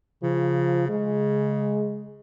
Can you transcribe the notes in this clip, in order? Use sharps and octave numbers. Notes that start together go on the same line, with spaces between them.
C#3 F3
C#3 G#3